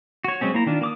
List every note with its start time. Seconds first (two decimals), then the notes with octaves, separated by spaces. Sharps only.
0.24 F#4 C#5
0.41 F#3 G#3 C4 C#4
0.54 A#3 E4 A#5
0.66 D#3 D4 F4
0.81 A#3 D6 D#6